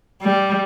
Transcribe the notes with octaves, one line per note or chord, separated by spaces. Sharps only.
G3